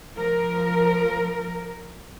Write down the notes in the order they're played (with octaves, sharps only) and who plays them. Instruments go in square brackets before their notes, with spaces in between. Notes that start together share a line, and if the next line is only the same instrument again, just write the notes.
[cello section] F3 A#4